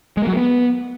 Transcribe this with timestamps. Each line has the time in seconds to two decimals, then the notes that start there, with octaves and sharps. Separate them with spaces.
0.17 G#3
0.22 A#3
0.27 F#3
0.32 A#3
0.37 B3